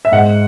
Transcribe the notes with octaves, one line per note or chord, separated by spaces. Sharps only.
E5
G#2 F#5